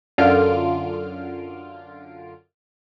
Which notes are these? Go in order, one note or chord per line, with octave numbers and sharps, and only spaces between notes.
F#2 D3 F4 F6 D7